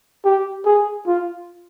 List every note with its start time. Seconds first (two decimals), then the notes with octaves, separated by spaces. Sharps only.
0.25 G4
0.65 G#4
1.07 F4